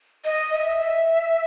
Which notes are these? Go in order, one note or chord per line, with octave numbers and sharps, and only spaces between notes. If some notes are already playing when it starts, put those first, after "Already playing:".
D#5
E5
E5